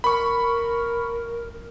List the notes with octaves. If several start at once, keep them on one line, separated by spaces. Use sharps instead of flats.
A#4 B5 C#6